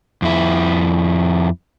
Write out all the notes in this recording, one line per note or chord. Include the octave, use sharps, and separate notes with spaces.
F2 E4